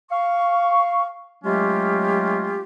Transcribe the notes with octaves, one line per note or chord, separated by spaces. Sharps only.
F5 C#6
F#3 G#3 A3 C#4 F4 G4